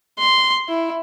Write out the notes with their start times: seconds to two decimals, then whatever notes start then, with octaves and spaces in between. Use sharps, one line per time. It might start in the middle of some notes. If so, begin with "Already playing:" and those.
0.18 C6
0.69 E4